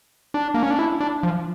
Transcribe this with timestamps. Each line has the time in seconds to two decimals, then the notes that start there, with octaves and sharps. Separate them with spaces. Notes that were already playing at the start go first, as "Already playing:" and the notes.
0.34 D4
0.54 A#3
0.63 C#4
0.70 D4
0.79 E4
1.00 D4
1.23 F3